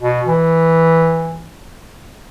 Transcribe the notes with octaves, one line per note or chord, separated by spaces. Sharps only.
B2
E3